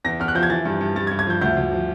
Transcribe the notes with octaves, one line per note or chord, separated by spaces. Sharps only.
E2 A#6
E2 F6
F#6
F3 G6
G#6
E3 A6
G2
G2
G2 A6
G#6
G2
G#6
F3 G6
D2 G6
D2
F3